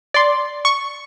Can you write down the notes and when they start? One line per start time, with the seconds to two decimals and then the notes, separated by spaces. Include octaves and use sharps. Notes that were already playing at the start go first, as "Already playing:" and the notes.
0.14 D5 C6
0.65 C#6